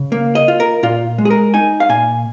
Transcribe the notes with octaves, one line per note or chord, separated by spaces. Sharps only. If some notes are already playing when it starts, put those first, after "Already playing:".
Already playing: C#3
A#3
D#5
F4
A#4
A#2 F4
G#3
G#4
A#4
D#4 G#5
F5
A#2 G#5